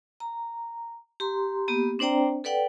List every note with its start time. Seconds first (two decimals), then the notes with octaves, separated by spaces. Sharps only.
0.20 A#5
1.20 G4 A#5 C6
1.68 A#3 B3 G4
1.99 C4 D4 C5 D5 G5 A#5
2.44 A4 B4 D5 F#5 G5